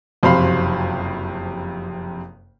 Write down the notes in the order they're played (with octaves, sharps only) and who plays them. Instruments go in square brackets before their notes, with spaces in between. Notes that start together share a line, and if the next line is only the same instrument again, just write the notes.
[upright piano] F#1 F2 C3 C5 F5 B5